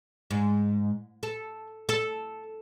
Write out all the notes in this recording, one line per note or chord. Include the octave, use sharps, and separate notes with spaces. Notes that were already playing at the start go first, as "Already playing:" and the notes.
G#2
A4
A4